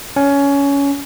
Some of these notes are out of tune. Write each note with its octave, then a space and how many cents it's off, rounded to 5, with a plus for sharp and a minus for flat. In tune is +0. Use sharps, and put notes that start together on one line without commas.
C#4 +20